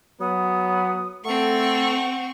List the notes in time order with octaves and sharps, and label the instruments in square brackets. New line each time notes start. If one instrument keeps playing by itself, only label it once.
[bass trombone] F#3 [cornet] B3 [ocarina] D#6
[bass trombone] A3 [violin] C4 C#6 [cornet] A4 [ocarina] F#5